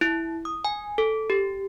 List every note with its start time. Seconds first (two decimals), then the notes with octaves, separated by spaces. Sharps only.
0.01 E4
0.45 D#6
0.65 G#5
0.98 A4
1.30 G4